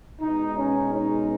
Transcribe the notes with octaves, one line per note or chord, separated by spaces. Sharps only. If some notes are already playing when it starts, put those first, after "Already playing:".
B2 G#3 B3 D#4
C#4
D#4